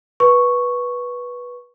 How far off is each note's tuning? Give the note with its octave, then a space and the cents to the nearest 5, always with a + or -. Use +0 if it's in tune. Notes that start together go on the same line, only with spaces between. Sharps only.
B4 -15 C#6 +0